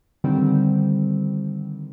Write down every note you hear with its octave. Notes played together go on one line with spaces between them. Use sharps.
D3 D#3 G3 C4